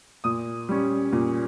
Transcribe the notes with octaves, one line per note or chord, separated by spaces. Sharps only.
A#2 D#6
G3 C#4
A#2